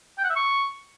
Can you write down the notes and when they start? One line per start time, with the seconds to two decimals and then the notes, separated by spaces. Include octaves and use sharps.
0.18 G5
0.24 F#5
0.30 E5
0.36 C#6